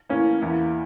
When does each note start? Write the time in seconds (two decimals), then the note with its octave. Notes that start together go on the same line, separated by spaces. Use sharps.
0.09 A2 E3 A#3 C#4
0.42 E2 E3 A#3 E4